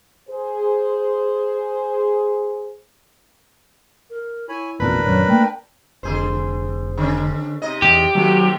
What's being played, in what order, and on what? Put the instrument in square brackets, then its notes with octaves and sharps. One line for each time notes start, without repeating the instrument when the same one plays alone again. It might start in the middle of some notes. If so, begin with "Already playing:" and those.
[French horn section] G#4 C5
[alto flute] A#4
[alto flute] E4 [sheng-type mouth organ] C#5 G#5 B5
[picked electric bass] A1 F2 B2 [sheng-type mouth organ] D4 A#4 [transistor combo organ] B4
[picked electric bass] D#1 F#2 [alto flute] C#5
[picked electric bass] A3 A#3 [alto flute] G5
[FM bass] F1 [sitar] D3 G#4 C5
[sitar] D3 C#4
C3 D#4 D#5
[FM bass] E2 [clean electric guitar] G4
[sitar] D#2 C3 A3 [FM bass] F#3